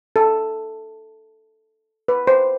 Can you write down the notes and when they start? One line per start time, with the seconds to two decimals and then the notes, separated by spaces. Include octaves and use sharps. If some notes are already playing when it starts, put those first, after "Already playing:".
0.16 A4
2.08 B4
2.27 C5